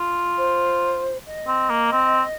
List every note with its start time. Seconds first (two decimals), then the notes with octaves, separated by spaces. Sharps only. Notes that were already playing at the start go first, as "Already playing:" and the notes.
Already playing: F4
0.37 C5
1.26 D#5
1.48 C4
1.70 A#3
1.92 C4